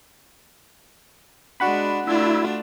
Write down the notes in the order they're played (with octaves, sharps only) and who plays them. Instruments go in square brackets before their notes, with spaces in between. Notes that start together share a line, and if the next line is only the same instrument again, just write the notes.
[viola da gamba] G#3 D4 [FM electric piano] F#4 F#5 B5
[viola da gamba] A3 D4 F4 [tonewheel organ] E4